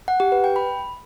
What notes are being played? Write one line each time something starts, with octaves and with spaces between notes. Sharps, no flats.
F#5
G4
B4
G5
B5